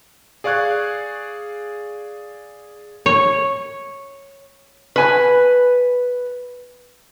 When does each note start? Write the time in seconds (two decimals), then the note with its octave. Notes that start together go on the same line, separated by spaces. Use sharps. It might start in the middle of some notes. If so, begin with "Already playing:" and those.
0.44 G#4 D5 F5 C#6 F#6 G#6
3.06 C#5
4.96 B4 G#5